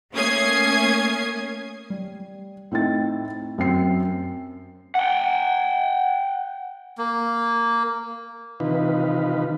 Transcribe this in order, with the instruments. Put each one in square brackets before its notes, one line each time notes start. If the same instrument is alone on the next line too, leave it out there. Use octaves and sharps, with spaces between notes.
[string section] A3 A#3 C#4 D#6 G#6 C7
[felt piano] G3
A2 C4 D#4 A6
F#2 C4 C7
[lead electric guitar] F#5 G5
[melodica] A#3
[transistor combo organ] C3 D#3 E3 D#4 F4 B4